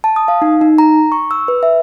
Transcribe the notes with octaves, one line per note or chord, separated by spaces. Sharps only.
A5
D#6
F5
D#4
D#4
A#5
C#6
E6
B4
E5